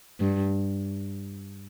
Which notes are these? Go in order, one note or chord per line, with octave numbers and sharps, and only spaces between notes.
G2